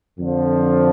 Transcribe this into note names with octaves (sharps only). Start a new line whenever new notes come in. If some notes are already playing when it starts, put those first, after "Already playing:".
F2 D3 F3